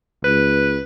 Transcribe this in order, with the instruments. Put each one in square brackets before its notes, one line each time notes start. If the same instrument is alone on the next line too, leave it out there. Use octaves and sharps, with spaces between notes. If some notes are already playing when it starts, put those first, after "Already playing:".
[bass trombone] C#2 [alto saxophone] B4